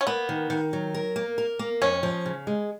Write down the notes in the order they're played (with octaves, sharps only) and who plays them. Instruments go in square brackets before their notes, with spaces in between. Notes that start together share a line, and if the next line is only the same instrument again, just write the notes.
[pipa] C#4
[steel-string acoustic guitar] A#3 [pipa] B3
[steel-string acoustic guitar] D#3
D#3
F#3
A#4
A#3
A#4
A#3
[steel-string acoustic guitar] F2 [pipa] C#4
[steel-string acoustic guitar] F3
C#3
G#3